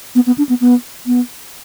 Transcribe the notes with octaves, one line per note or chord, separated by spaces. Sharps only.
B3
B3
D4
B3
B3
B3